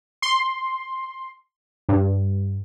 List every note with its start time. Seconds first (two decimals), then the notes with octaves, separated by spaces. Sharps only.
0.22 C6
1.89 G2